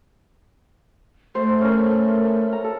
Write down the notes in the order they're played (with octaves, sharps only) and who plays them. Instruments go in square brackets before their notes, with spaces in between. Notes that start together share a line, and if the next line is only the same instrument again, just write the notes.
[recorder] A3 [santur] C5
[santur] C#4 A#4
B5
A#5
A4